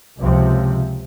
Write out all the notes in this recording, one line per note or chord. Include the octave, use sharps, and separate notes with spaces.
C#2 C3 F3